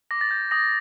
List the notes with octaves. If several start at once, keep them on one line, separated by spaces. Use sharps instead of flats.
D6 A#6
A6
G6
D#6 A#6